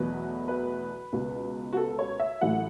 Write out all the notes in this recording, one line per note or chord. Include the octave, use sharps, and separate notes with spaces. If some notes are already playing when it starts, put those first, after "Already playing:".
Already playing: E2 B2 F#3 A3 E4 B4
B4
C#2 B2 B3
F#4
A4
C#5
E5
A1 A2 F#3 A3 E4 F#5